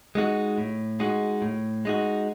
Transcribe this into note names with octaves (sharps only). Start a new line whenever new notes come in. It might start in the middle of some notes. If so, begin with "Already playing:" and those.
G#3 D#4 F#4
A2
G#3 D#4 F#4
A2
G#3 D#4 F#4